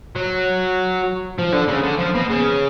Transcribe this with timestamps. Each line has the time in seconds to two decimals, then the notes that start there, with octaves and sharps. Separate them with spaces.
0.16 F#3
1.39 F3
1.53 D3
1.68 C#3
1.83 D3
1.99 F3
2.15 B2
2.30 C#3